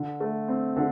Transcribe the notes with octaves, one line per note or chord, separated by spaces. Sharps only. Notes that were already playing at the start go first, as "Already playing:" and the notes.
Already playing: D3
A3
C4
D3